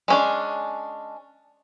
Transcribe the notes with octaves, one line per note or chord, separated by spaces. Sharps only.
G#3 C#4 D4